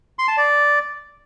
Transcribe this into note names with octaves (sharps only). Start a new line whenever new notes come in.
C6
A5
D5